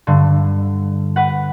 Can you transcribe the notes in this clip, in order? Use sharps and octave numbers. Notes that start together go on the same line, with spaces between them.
G2 D3
B4 F#5